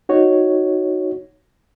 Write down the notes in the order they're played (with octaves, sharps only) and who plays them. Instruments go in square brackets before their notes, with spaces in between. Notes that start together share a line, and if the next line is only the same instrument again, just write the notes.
[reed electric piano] D#4 F#4 C#5